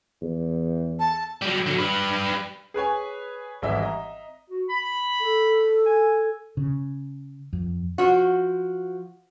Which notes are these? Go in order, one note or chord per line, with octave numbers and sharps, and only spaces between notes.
E2
A5
F#3 G3
D3 F#3
G3 B4
G#4 B4 C#5 G#5
G#1 D3 E3 G3 D#5 E5
D#5 E5 A#5
F#4
B5
A4
G#5
C#3
F2
F3 F#4